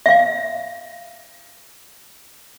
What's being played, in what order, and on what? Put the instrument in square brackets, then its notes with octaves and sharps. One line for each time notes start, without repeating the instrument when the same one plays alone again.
[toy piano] E5 F5